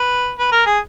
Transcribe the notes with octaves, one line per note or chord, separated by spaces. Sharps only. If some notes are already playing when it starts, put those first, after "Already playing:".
Already playing: B4
B4
A#4
G#4